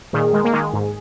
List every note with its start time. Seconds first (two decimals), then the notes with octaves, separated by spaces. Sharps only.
0.13 A#2 D#3 G#4
0.33 D#3 G#3
0.44 A#3
0.53 D#3 G#3
0.73 G#2